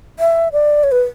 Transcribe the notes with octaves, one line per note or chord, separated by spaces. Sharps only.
E5
D5
C#5
B4